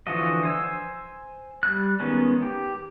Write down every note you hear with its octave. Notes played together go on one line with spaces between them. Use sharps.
D3 E3 F3 F#4 D#5
C5 G#5 E6
G3 F#6
D#3 G#3 B3 C#4
G4